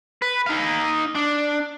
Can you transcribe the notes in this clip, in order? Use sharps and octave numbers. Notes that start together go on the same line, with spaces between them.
B4
D#4 F5
D4